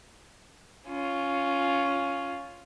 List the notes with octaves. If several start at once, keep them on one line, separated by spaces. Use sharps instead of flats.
C#4 F4